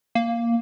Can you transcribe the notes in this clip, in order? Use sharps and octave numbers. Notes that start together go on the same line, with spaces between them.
A#3